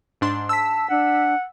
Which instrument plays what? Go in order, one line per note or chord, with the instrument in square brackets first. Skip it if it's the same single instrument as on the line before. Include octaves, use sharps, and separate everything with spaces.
[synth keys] G#2 D4 C6
[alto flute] A5 [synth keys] E6 B6
[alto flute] D4 [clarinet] F#5